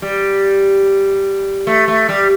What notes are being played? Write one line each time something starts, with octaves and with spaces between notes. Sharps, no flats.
G3
A3
A3
G3